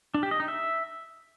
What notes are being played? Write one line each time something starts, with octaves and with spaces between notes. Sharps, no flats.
D4
G4
D#5
D#4
E5